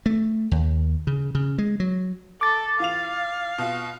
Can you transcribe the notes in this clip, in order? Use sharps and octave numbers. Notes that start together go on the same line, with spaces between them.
A3
D#2
C#3
C#3
G#3
F#3
A4 D6 A6
E3 F4 F5 F7
B2 F4